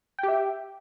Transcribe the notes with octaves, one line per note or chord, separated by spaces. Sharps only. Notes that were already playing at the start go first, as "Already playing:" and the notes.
G4 E5 G5